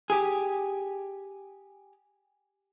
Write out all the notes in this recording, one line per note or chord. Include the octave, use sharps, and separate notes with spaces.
G4 G#4